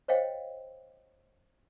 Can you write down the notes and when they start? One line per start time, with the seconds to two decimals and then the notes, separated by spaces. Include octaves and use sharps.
0.08 C5 C#5 D#5 F5 G5